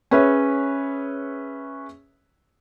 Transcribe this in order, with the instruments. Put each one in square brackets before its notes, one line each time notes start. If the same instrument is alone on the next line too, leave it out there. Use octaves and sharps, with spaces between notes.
[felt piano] C#4 G#4 B4 C#5 E5